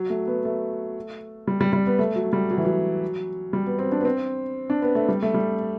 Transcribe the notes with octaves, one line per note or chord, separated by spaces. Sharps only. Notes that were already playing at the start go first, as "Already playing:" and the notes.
Already playing: F#3
A3
B3
A3
G3
G3
G3
B3
A3
F#3
G3
F#3
E3
F#3
G3
B3
C4
D4
B3
C4
D4
B3
A3
G3
A3
G3